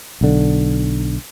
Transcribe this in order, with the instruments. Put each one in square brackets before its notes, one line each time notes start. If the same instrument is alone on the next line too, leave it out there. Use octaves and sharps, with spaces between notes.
[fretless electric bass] B1 D3